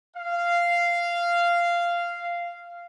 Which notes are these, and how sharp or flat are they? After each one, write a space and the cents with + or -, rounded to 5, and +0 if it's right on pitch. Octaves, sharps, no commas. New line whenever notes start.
F5 -10